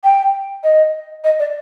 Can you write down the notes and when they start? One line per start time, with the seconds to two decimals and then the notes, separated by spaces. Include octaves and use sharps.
0.04 G5
0.64 D#5
1.24 D#5
1.39 D5